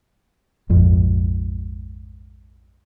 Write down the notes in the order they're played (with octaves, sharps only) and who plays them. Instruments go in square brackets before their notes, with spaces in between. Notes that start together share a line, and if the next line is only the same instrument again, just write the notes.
[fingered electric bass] A#1 F2 G#2